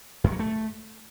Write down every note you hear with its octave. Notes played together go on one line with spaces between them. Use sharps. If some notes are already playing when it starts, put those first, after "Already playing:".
F#2
F#3
A3